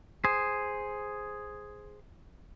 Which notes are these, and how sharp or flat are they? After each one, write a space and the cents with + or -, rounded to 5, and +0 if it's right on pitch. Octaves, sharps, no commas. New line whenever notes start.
G#4 +0 C5 +0